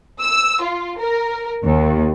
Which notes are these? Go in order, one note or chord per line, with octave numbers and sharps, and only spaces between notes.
E6
F4
A#4
D#2